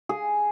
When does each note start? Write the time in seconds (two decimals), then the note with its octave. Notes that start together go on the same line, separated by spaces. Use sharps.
0.09 G#4